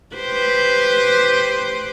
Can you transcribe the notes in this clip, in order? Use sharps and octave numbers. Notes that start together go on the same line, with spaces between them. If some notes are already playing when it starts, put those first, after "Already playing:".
G4 B4 C5